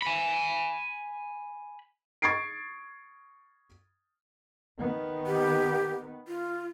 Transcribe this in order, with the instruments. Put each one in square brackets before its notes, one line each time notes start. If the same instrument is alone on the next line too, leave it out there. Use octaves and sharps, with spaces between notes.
[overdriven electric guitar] G#5 B5
[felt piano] C#6 G#6 A6 C7 D7
[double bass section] D#3 B3
[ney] G4
F4